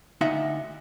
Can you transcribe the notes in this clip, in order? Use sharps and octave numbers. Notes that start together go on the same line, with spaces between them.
D2 D#4 E5 F#5